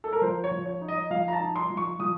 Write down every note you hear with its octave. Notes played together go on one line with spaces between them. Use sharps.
A4
A#4
F3 C5
C#5
F3
C#5
D#4
D#5
F3 F5
A#5
A5
D#4
C6
F3
C#6
F3 D#6